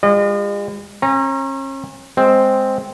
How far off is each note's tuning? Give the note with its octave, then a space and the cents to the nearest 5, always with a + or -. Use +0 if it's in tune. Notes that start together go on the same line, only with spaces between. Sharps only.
G#3 -45 F4 +0 D#5 -40
C#4 -40 A#5 +0
G#3 +0 C4 +0